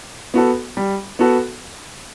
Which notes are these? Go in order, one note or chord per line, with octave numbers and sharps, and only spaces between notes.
B3 F#4 A4
G3
B3 F#4 A4